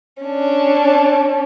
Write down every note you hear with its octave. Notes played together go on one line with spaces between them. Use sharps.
C#4 D4